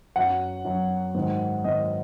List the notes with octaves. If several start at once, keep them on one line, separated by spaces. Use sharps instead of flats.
F#2 F#3 F#5
F#2 F#3
G#2 D#3 F#3
G#2 D#3 F#3 D#5